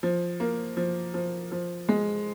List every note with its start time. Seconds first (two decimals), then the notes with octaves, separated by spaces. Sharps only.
0.03 F3
0.40 A#3
0.77 F3
1.14 F3
1.52 F3
1.89 G#3